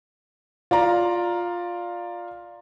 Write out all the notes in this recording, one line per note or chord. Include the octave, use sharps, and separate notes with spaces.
F4 D5 A#5